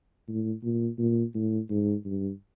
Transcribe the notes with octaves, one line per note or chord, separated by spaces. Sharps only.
A2
A#2
A#2
A2
G#2
G2